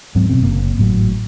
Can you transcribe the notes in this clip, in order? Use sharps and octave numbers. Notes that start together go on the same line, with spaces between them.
D#2 G#2 F#3 C4
F1 F#2 B2 C4
F#1 A#3
G#1 A2 F#3